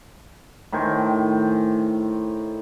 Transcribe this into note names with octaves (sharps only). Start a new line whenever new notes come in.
A2 D#3 C5 G#5